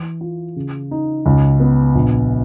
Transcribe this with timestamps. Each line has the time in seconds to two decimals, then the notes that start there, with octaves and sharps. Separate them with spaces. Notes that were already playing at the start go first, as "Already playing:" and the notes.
Already playing: E3
0.21 F4
0.56 C#3
0.91 D#4
1.26 C#2
1.60 B3
1.95 A#1